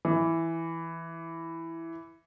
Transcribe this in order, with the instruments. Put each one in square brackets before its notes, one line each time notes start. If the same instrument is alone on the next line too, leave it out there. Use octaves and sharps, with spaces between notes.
[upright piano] E3